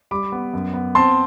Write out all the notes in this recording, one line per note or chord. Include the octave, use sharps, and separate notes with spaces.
G3 B5 D6
B3
F#2
B3
C4 A5 C6